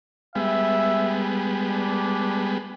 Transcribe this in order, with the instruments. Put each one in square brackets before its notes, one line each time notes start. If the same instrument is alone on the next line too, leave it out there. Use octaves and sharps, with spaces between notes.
[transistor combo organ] G3 G#3 B3 [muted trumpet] E5
[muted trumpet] D4